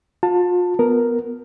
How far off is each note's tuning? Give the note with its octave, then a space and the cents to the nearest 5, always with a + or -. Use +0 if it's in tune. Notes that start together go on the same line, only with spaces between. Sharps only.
F4 +35 A5 +15
B3 +0 A#4 +0